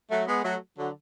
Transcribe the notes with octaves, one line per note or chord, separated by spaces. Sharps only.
F#3 A3
G#3 B3
F#3 A3
D3 F#3